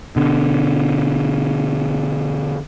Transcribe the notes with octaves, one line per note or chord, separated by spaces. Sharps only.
B2 D3